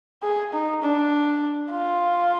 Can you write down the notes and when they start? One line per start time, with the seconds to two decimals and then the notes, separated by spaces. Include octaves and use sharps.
0.23 G#4
0.53 D#4
0.82 D4
1.71 F4